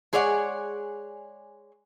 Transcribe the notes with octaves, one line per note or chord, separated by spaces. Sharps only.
G#3 G#4 C#5 D5 E5 F#5